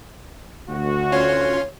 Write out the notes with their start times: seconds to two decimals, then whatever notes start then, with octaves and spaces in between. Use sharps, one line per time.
0.70 D2 F#4
1.12 C#4 F4 C#5 C6